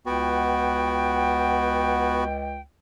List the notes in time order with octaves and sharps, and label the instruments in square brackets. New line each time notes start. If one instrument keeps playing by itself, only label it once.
[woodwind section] C#2 G5 [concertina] B3 F#4